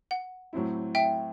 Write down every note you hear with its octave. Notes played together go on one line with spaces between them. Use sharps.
F#5
A2 F#3 C4 E4
E5 G5